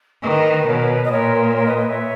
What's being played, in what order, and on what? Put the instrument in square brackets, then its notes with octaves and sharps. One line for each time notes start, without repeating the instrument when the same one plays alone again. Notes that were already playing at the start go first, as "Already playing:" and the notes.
[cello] D#3 [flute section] B4 D#5
[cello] B2 [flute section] A#4 C#5
[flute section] C#5
B4
D#5
[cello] A#2 [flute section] A#4 C#5
[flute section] A#4 C#5
B4 D#5
B4 D#5
C#5 E5